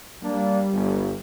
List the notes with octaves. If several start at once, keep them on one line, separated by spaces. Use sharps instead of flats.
G3 A#3 D4
G1